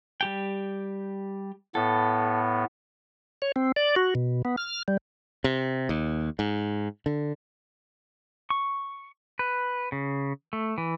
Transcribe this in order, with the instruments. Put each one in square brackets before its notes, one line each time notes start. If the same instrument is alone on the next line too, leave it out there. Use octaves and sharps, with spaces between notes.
[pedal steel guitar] G3 G4 G5
[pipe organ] A2 B3 [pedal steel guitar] A4
[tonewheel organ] C#5
C4
D5
F#4
B2
B3
F6
G3
[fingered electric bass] C3
D#2
G#2
D3
[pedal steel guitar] C#6
B4
C#3
A3
E3